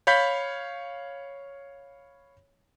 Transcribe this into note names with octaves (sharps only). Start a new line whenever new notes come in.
C#5 F5 B5 G6 B6